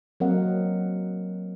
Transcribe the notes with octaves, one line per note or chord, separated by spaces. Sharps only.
F#3 A#3 C4 A#4 D#5 F#5